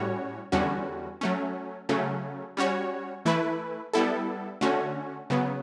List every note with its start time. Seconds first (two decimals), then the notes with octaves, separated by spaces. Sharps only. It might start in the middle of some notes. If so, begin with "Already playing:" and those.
Already playing: A2 G3 C#4 F#4 C#5
0.52 E2 D3 G3 C#4 F#4
1.21 F#3 A3 C#4
1.89 C#3 F#3 A3 C#4
2.57 G3 C#4 F#4 C#5
3.25 E3 A3 E4 B4
3.93 G3 B3 E4 A4
4.61 D3 A3 C#4 F#4
5.30 C#3 F#3 B3